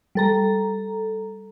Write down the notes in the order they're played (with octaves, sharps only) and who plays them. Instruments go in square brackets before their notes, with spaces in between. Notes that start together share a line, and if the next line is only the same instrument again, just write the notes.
[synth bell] G3 A4 A#5